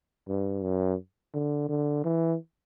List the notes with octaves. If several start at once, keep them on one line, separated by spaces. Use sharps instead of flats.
G2
F#2
D3
D3
E3